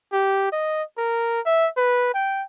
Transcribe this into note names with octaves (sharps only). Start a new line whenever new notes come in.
G4
D#5
A#4
E5
B4
G5